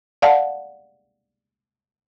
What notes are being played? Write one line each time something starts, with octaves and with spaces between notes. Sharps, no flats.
D5 F5 F#5 A5